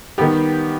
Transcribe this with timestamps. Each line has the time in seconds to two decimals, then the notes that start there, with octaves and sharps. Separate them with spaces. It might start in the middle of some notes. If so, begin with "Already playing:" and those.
0.18 D#3 G3 B3 G4